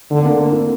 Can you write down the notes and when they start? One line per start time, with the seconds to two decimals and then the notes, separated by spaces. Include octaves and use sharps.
0.11 D3 A3
0.18 C4
0.25 A#3
0.38 C4
0.52 E4